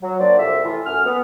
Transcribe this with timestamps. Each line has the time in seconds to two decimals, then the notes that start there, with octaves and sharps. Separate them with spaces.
0.02 F#3
0.20 A#3 D4 F#4 C5 D5
0.39 C2 F2 E5
0.64 A2 E3 F4
0.86 F#2 A3 F#5 G#5 F6
1.05 B3